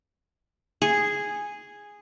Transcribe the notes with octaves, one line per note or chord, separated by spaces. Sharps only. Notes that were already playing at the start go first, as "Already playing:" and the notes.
G#4